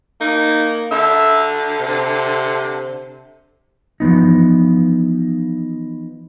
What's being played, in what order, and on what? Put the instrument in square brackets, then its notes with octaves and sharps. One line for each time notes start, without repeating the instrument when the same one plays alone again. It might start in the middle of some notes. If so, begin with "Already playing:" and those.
[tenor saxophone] A#3 [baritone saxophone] D#4
[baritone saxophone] D3 [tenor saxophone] E5
[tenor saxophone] C3
[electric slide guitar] E3 F3 B3 D#4